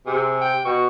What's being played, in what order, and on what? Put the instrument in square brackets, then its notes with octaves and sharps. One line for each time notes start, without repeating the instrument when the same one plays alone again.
[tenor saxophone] C3 [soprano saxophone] G#4
[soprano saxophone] G5
[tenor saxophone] B2 [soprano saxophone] C#6